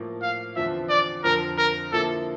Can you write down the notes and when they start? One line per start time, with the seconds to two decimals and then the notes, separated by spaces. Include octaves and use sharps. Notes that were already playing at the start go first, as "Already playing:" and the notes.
Already playing: A2 F3 A#3
0.22 F5
0.56 E2 D3 F3 C4 E5
0.89 D5
1.24 F2 D3 F3 C4 A#4
1.58 A#4
1.92 D3 F3 A#3 E4 A4